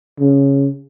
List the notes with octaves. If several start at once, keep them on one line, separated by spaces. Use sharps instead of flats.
C#3